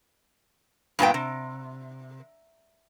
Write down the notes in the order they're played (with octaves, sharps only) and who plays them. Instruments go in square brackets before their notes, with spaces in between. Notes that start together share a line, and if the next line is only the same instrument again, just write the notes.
[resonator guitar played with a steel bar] G2 A#2 B3 G5
C3